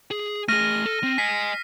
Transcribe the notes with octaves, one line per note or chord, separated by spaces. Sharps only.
G#4
A3 G#4 F6 A#6 D#7
A4
C4
D#5 G#5 B6 C7